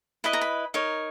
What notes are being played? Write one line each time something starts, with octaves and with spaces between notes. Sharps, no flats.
E4 B4 D#5 B5
A#5
B5
D#4 A#4 C#5